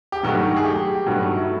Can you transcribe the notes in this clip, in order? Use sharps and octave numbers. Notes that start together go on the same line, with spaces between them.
G4
G2 D#3 F#3 A3 F#4
G#4
G4
G2 D#3 F#3 A3 F#4
E4